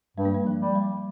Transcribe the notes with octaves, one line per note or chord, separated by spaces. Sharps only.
G2 G3
A#3
G3
F3
G3
G3